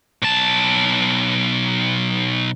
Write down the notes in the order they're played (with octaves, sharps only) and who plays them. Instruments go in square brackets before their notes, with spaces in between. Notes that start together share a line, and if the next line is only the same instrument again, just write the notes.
[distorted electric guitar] B1 A5